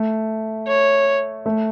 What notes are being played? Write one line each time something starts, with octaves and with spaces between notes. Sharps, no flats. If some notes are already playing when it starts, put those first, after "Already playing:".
Already playing: A3
C#5
A3